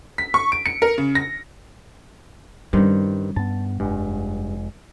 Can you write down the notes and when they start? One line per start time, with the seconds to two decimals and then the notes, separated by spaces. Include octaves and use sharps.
0.18 B6
0.34 C#6
0.52 D7
0.66 C#7
0.82 A#4
0.98 C#3
1.15 A#6
2.73 G2 D#3 G3 C#4 C5
3.36 G2 B3 A5
3.80 F1 G2 G#3